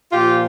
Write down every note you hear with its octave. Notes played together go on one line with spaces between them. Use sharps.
A#2 F3 F4 G4